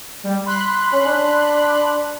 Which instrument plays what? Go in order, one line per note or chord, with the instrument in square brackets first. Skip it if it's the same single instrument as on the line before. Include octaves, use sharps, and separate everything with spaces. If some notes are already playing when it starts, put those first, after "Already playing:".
[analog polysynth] G3
B5 C6 F#6
[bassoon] C#4
D4